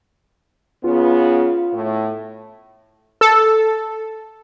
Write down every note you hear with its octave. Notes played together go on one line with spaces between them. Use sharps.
C#3 B3 F4
A2
A4